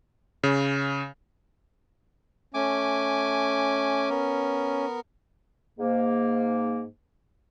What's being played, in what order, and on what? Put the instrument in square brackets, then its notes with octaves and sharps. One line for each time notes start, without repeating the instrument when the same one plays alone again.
[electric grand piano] C#3
[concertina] A3 G#5 D6 [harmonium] C#4
[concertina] B3 A#4
[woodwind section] G#2 A#3